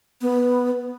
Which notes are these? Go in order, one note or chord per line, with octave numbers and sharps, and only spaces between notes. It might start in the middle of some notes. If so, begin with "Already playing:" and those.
B3